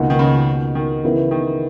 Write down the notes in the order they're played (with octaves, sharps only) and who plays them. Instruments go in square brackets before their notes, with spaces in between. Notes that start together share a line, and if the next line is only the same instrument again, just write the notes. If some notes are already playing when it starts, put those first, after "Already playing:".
Already playing: [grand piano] C#2 B2 A#3 D#4 F#4
[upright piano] D#3
C#3
D#3
[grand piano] C#3 E3 B3 E4 A#4
[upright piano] D#3